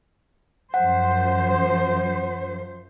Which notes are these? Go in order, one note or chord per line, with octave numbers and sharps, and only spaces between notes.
F#2 F3 C5 F#5